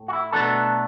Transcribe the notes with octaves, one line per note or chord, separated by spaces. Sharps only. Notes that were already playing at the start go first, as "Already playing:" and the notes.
Already playing: A2
F#4
E4
B2 F#3 A3 B3 D4 A4